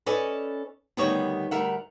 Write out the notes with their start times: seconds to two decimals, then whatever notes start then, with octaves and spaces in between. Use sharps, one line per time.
0.06 C#4 A4 B4 D5 D#5 G#5
0.97 D2 D#3 G3 B3 G4 C#5
1.51 D2 G3 A#4 E5 F#5